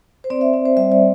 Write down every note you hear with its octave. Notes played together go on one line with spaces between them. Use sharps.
C5
C4 D5
E5
C4
C5
G3 E5
D5